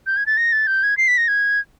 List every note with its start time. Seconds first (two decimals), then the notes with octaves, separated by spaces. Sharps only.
0.07 G6
0.17 G#6
0.26 A6
0.37 A#6
0.52 A6
0.67 G6
0.83 G#6
0.97 C7
1.08 B6
1.17 A#6
1.28 G#6